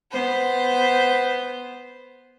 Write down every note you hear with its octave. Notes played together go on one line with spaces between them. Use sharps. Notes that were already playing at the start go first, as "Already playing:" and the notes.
B3 C5